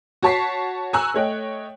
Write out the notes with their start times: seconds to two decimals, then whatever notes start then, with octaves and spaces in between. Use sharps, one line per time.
0.23 F#4 C#5 A5 C#6 B6 C7
0.93 G#5 A#5 C#6 E6 F#6
1.14 A3 C#5 D#5 G5